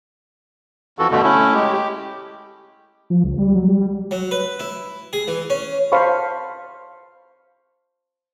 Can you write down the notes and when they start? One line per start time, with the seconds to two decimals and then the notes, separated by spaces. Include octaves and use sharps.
0.99 F2 E3 F#4 A4
1.11 G2 B2 D3 A3
1.24 A3 C#4 E4
1.54 G#3 G4
1.73 G4
3.10 F3
3.24 C#2
3.38 G3
3.55 F#3
3.68 G3
4.11 F#3
4.31 B4
4.60 E4
5.13 G#4
5.27 E3
5.50 C#4
5.92 C5 F5 A5 B5 C#6